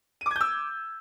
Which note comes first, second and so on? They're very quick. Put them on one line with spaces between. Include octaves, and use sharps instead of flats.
D#7 D6 G#6 G6 E6